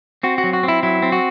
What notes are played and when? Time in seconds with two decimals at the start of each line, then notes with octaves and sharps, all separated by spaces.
0.23 C4 F#4
0.38 F#4
0.44 F#3
0.53 F#4
0.63 C4 E4
0.83 F#3 E4
1.02 C4
1.12 F#4